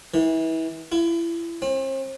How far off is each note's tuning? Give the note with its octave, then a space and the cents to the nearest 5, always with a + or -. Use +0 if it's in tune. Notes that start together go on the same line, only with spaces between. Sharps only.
E3 -30
E4 +30
C4 +40